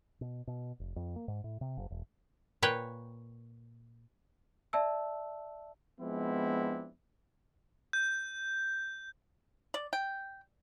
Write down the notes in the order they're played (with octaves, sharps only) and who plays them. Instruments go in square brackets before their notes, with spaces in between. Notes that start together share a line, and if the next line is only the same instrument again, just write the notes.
[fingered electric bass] B2
B2
F1
F2
A#3
G#2
A2
C3
F#1
E1
[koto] A#2 B4 C#5 G5
[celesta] D5 E5 A5 E6
[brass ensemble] F3 G#3 B3 C4 D4 E4
[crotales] G6
[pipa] D5
G5